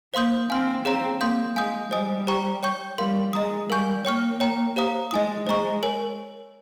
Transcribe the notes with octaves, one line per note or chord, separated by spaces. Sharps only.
A#3 C5 F5 C6 D#6 G6
C4 F5 G#5 C6 F6
C4 G#4 C#5 F5 A#5
A#3 F5 C6 D#6 G6
G#3 F5 G#5 D#6 G6
G3 C5 D#5 G#5 D#6
G4 C5 G5 A#5 C#6
C#5 G5 C#6 G6
G3 A#4 F5 C6
G#3 D#5 A#5 D#6
G3 A#4 F5 G#5 C#6 G6
A#3 C#5 G5 C#6 F6
C#5 G5 A#5
G4 C5 F5 A#5 D#6
G#3 D#5 G#5 D#6
G#3 C5 D#5 A#5 C#6
A#4 C#5 G#5